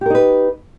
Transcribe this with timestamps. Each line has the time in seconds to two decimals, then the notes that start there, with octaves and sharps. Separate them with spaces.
0.01 G4
0.06 A#4
0.10 D#4
0.15 B4